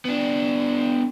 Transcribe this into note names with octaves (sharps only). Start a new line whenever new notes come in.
B3 D4